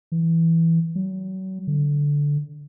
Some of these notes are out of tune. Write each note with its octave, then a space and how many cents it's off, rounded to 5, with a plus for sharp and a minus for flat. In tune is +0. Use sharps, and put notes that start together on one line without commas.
E3 +0
F#3 +35
D3 -10